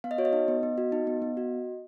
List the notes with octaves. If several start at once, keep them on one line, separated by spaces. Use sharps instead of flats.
B3 F5
D#5
F#4 C#5
D#5
D#4
B3
B3
F#4
D#4
B3
B3
F#4